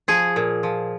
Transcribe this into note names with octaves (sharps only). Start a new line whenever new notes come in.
F3 G#4
A#2
F3